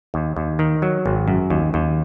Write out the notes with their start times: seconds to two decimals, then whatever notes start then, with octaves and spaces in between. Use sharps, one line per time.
0.14 D#2
0.36 D#2
0.59 D#3
0.82 F#3
1.06 G#1
1.28 F#2
1.50 D#2
1.74 D#2